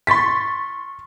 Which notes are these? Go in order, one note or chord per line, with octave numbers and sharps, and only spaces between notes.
C6 C#6 A6 B6